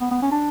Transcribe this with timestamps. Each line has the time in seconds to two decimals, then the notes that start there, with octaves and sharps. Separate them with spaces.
0.01 B3
0.11 B3
0.22 C#4
0.31 D4